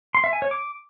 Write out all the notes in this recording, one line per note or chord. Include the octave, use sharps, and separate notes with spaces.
C6
E5
G#5
C#5
D6